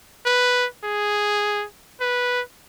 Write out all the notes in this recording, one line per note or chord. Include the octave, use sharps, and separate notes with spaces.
B4
G#4
B4